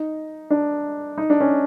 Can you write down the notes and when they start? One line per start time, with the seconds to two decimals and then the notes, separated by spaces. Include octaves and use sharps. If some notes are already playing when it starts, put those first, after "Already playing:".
Already playing: D#4
0.50 D4
1.18 D#4
1.30 D4
1.40 C#4